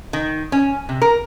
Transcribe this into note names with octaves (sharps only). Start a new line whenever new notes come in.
D#3
C#4
C3
A#4